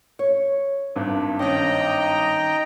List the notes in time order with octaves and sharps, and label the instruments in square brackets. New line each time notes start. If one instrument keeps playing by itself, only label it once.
[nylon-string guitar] C#5
[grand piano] G#1 G2
[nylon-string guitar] D#3 C#4 [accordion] D#5 G5 A#5